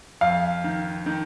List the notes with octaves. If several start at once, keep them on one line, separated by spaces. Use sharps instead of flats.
F2 F5
D#3
D#3